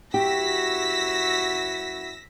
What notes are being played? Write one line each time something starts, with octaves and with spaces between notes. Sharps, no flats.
F#2 E4 F#4 G4 E6 A#6 B6